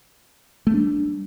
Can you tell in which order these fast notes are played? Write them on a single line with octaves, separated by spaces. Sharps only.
A3 B3 D4 G3